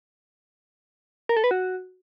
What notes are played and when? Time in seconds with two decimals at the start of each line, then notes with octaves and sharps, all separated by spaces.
1.29 A#4
1.37 A4
1.44 B4
1.51 F#4